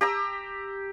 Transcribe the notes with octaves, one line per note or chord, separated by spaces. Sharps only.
G4 A#5 E6